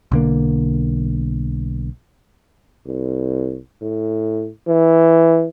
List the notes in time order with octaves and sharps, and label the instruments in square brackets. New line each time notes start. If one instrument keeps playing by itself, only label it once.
[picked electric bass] B1 D3 A#3
[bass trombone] C2
A2
E3